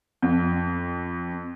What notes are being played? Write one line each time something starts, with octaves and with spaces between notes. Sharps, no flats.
F2